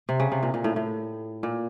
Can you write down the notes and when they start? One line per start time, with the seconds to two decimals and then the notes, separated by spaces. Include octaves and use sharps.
0.09 C3
0.20 C#3
0.32 C3
0.43 A#2
0.54 A#2
0.64 A2
0.76 A2
1.43 A#2